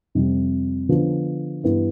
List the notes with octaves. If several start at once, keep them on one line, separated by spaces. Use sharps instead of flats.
F2 C3 G3
D3 F3 B3 D4
G2 E3 B3 E4